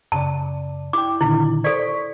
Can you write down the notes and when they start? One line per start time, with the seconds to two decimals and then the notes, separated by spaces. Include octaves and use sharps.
0.12 F#2 C#3 D5 A5
0.93 E4 G5 D6
1.21 A#2 D3 D#3 E4
1.64 A4 C5 D5 C#6 B6